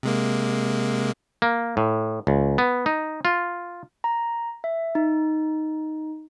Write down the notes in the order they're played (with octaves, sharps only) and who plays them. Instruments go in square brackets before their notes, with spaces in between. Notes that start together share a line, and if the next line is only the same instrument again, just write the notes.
[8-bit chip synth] C3 G#3 A#3
[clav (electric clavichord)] A#3
A2
C#2
B3
D#4
F4
[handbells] A#5
E5
D#4